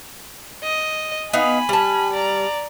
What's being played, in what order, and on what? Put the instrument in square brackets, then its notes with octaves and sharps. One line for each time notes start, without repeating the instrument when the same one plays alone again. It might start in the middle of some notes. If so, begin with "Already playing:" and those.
[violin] D#5
[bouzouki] B3 D#4 F5 [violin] G#5 B5
[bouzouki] G3 A5
[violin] D5 A#5